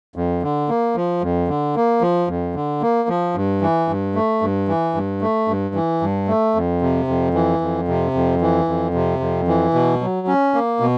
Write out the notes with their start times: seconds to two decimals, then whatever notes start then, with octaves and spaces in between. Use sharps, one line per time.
0.16 F2
0.43 D3
0.69 A#3
0.95 F3
1.22 F2
1.48 D3
1.75 A#3
2.01 F3
2.28 F2
2.55 D3
2.82 A#3
3.09 F3
3.35 G2
3.61 E3
3.88 G2
4.15 A3
4.42 G2
4.68 E3
4.95 G2
5.21 A3
5.48 G2
5.75 E3
6.01 G2
6.28 A3
6.55 F2
6.82 C3
7.08 F2
7.34 E3
7.61 F2
7.88 C3
8.14 F2
8.41 E3
8.68 F2
8.94 C3
9.20 F2
9.48 E3
9.74 B2
10.01 F#3
10.27 C#4
10.54 A#3
10.80 B2